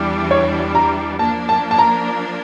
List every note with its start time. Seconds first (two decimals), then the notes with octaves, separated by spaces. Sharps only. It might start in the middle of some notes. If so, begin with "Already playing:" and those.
Already playing: E2 E3 G3 D4
0.31 C#5
0.75 A#5
1.19 F3 A#3 D4 A5
1.49 A5
1.71 A5
1.79 A#5